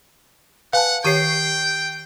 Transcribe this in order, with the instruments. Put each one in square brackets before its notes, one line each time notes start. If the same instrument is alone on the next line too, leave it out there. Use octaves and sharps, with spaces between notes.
[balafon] B4 [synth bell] F5 G#5 A5 [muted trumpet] F#5
[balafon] D#3 G4 C#5 [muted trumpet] G5 [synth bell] C#6 C7